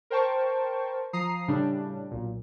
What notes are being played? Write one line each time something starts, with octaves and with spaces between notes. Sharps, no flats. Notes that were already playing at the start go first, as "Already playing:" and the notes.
A#4 C5 G5 A5 C#6
F3 A#5 D#6 C7
A2 C#3 G3 D4
B1 A#2